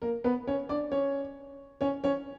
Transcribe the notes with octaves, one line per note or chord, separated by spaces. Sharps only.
A#3 A#4
B3 B4
C#4 C#5
D4 D5
C#4 C#5
C#4 C#5
C#4 C#5